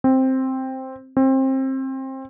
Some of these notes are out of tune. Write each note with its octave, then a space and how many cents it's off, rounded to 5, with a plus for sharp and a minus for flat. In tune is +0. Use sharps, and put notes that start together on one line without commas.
C4 +5
C4 +25